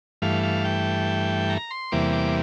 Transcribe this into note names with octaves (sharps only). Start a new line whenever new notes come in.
G2 E3 A3 F5
F5
G5
A#5
C6
E2 C3 E3 G3 A#3 D6
D6